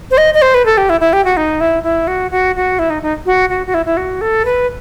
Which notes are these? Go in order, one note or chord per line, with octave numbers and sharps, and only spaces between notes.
C5
D#5
D#5
C5
B4
A4
G4
E4
E4
G4
F#4
D#4
E4
E4
F#4
F#4
F#4
E4
D#4
D#4
F#4
F#4
F#4
E4
E4
F#4
A4
B4